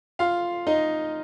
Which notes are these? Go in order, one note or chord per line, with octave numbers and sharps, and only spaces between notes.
F4 F5
D#4 D#5